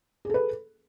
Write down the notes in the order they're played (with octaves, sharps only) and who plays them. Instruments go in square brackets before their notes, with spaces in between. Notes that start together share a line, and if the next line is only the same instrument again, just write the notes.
[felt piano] G#4
A4
B4